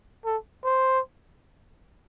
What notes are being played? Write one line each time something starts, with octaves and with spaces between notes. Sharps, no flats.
A4
C5